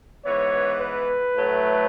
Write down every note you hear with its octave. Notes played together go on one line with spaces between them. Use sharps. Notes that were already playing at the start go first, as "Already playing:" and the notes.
G#2 E3 B3 C#5
B4
A2 F#3 A3